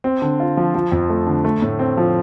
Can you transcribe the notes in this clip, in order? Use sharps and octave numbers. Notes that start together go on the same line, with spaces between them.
C4
D3
F4
F3
F3
F2
A3
D3
A3
A2
C4
F3